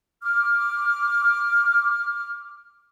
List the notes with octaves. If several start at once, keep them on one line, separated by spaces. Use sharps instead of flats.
D6 F6